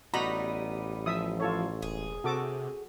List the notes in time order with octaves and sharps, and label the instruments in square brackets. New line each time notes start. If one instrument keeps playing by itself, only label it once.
[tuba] A1 [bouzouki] G3 B3 D#4 [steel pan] F#4 A#5 B5
[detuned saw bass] F3 [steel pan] E5 D#6
[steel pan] F4 A4 C#5
[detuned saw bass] E1 [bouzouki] G#4
[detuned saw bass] C3 [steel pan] F#4 A4 D6